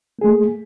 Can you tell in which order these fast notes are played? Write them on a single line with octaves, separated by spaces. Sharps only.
A#3 G#4 A3